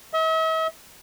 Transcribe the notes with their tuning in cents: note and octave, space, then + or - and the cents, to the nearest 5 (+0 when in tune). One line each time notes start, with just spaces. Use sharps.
E5 -45